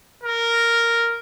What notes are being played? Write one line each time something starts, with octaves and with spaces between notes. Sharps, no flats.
A#4